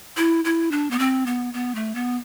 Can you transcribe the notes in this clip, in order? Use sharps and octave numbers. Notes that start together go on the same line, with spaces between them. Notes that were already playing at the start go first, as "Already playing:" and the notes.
E4
E4
D4
B3
C4
B3
B3
A3
B3